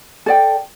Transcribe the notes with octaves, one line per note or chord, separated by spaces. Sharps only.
A4 D5 G5